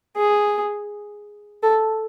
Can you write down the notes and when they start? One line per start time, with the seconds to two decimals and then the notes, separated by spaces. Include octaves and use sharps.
0.17 G#4
1.63 A4